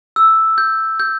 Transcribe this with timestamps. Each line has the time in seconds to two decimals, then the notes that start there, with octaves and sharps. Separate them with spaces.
0.16 E6
0.58 G6
1.00 G6